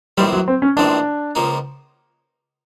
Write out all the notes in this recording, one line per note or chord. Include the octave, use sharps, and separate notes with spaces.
A#1 A2 E3 G3 G#3 C4
F#3
C4
C#4
A#1 A2 E3 G#3 C4 D4
C#2 C#3 F3 A#3 D#4